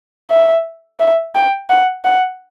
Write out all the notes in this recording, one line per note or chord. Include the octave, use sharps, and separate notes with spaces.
E5
E5
G5
F#5
F#5